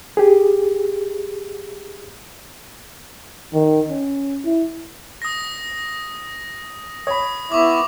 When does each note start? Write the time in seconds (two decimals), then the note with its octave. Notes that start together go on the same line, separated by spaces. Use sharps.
0.17 G4 G#4
3.53 D#3
3.89 C#4
4.44 E4
5.22 D#6 A#6
7.07 C#5 B5 D#6
7.52 B3 E4 E5 C#6 D6